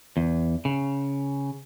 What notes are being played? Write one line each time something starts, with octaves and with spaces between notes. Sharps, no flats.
E2
C#3